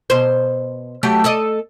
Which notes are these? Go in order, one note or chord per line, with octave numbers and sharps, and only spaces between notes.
B2 C5
F#3 A3 G4
A4 D5 D#5